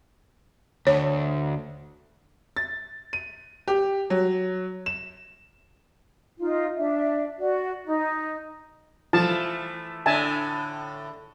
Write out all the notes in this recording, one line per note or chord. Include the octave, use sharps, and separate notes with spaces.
D2 C#5
A6
D#7
G4
F#3
E7
D#4 F4
D4 E5
F#4 D5
D#4
E3 F3 A3 A5
A2 D3 E5 G#5 A5